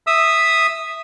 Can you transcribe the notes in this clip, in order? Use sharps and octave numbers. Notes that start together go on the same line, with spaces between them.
E5 D#6 E6